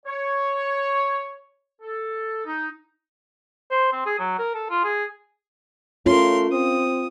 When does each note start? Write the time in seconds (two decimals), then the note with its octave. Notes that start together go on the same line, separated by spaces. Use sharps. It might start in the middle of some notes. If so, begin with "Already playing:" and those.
0.06 C#5
1.81 A4
2.46 D#4
3.71 C5
3.92 C4
4.06 G#4
4.19 F#3
4.38 A#4
4.54 A4
4.70 F4
4.84 G#4
6.06 A3 C#4 F4 A#4 C6
6.52 C4 D#6